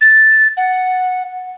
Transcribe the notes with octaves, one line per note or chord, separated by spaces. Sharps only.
A6
F#5